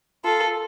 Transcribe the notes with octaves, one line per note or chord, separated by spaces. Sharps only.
F4 A4